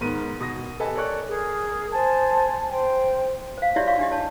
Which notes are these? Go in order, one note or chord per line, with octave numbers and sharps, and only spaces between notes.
G#2 D#3 B3 A#4 D#7
B2 D#6 A#6
G4 A4 B4 D#5 G#5 A5
A4 A#4 C#5 D5 C#6 F#6
G#4 A#4
C5 G#5 A5
C5 G5
C5 F5
E4 F#4 G4 C#5 D5 E5
F5 C6 C#6
D4 G4 D#5
C#5 A5